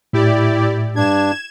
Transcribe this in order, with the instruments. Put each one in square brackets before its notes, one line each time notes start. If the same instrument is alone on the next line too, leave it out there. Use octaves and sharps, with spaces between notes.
[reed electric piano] A2 [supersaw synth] E4 G4 D5
[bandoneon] G2 D4 [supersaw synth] G#6 E7